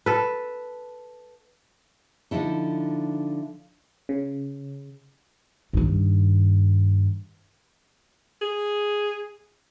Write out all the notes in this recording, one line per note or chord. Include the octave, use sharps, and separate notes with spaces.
A4 B4
D3 F3 D#4 E4 A4
C#3
G2 D#3
G#4